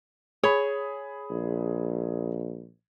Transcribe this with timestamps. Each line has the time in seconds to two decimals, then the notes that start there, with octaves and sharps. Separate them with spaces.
0.43 G#4 C#5 B5
1.30 A#1